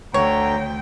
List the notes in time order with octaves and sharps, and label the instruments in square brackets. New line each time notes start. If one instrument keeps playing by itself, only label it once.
[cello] D2 G5 [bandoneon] D3 [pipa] C#5 [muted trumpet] A#5